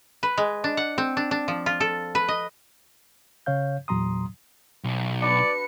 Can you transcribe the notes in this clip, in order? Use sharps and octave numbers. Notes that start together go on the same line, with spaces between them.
B4
G#3
D4
F#5
C4
D4
D4
F3
F4
A4
B4
D#5
C#3 C#5 F5 G6
E2 A#2 F#3 A#5 C6 D#6
B1
D4 F#4 B4 D5 C#7